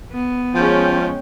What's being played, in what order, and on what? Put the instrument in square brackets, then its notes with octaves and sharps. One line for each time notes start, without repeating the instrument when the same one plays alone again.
[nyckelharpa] B3
[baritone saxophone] F3 [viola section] G#3 C#4 G5